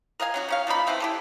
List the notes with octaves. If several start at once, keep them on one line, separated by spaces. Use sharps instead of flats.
A#4 D#5 F5 G#5
F#3 C#4 F#4
D#3 C#4 F5
F3 A#3 D#4 B5
A3 C4 E4 B4
E4 G4 A4